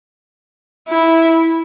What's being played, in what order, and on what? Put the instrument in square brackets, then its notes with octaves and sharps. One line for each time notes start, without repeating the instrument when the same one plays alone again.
[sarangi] E4